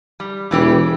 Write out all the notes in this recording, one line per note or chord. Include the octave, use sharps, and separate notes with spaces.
G3
E1 C#3 E3 G4